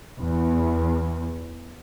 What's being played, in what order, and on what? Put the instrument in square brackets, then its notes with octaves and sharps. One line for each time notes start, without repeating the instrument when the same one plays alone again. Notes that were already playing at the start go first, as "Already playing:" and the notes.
[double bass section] E2